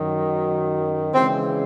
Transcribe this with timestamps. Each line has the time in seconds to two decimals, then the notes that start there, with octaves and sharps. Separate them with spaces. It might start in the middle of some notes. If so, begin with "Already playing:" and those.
Already playing: F#2 D#3 F#3
1.13 C#3 E3 G#3 C4